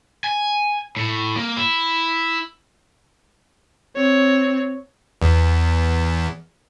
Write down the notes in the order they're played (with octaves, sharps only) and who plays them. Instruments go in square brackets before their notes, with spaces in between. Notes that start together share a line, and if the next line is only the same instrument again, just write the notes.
[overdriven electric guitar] G#5
A2
A#3
E4
[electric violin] C4 C#5
[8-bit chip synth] E2